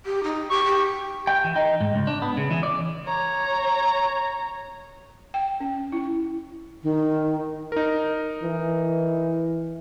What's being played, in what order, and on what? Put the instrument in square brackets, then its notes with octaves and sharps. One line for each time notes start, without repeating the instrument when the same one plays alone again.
[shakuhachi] G4
D#4
[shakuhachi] G4 [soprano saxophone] C#6
[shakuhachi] G4
[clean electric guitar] G5
E3
D#4
G#2
C#2
D4
B3
C#3
E3
D5
[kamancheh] C#5 A#5
[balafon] G5
C#4
E4
[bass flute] D#3
[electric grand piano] D#4 A#4
[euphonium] E3